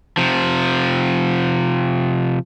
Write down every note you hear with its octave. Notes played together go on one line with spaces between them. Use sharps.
C3 F3